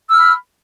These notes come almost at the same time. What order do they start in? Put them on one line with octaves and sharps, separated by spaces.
E6 F6 B5